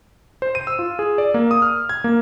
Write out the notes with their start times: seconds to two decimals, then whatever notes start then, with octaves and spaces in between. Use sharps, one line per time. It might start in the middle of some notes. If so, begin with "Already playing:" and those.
0.42 C5
0.55 D#7
0.67 E6
0.79 F4
0.99 G#4
1.18 D5
1.34 A#3
1.51 D#6
1.62 F6
1.89 G#6
2.04 A#3